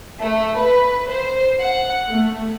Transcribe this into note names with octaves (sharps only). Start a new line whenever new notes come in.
A3
B4
C5
F#5
A3